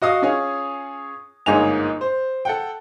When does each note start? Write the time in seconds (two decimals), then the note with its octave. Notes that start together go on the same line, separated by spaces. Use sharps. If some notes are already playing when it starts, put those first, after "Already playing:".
0.02 F#4 D#5 F5 D#6
0.22 C#4 F4 G#4 C#5 G#5
1.46 G1 G#2 A#3 D#4 G#5 F7
2.01 C5
2.45 A4 F#5 G5